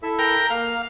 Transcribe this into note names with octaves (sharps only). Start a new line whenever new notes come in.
E4 A4 E5
A#4 G5
A#3 F5